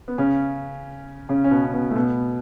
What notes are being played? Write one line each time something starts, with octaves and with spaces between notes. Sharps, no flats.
B3
C#3 C#4
C#3 C#4
C#4
B2 B3
C#4
B2 B3
A3
B2 B3